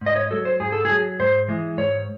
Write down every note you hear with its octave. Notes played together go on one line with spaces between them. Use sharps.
G#2
D#5
C#5
F#3 A4
C5
G#2 G#4
A4
F#3 G#4
G#2 C5
E3 G#3
G#2 C#5